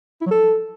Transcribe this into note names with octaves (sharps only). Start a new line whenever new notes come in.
E4
F#3
A4